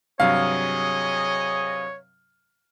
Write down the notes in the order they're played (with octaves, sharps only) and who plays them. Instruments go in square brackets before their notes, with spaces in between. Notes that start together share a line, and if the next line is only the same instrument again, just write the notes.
[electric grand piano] G2 C3 F#3 [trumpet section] G#4 D#5 [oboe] C#5 [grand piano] F5